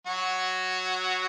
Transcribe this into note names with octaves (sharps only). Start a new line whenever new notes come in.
F#3 F#4